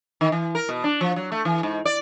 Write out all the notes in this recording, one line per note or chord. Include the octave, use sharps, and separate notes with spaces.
D#3
E3
A#4
B2
D4
F3
F#3
A3
E3
G#2
D5